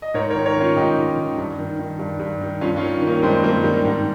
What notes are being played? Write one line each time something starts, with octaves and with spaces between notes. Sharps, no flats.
D#5
G#2 A#4 C#5
A#4 C#5
D#3
A#4 C#5
D#3 C#4 F4
G#2 D#4 G4
G#2
D#3
G2
D#3
D#3
G2
G2
D#3
G2 C#4 F4
C#4 F4
D#3
D#3
A#3 C#4
G2 G#3 C4
G2 G3 A#3
D#3 G3
G#2